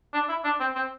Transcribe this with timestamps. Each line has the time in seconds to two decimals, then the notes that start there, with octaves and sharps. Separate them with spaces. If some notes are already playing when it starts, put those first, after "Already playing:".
0.14 D4
0.29 E4
0.44 D4
0.60 C4
0.76 C4